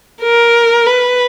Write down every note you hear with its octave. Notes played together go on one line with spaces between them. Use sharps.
A#4
B4